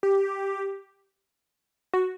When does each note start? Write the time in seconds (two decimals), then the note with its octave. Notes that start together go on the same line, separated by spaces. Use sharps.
0.03 G4
1.93 F#4